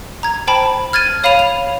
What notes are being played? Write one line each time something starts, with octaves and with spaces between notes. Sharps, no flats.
A#5 G#6
C5 G5 A5 B5
F6 G#6 A6 D#7
C#5 F5 B5 D#7 F7
F7